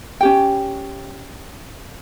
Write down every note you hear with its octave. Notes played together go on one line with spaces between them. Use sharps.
C#4 G4 G5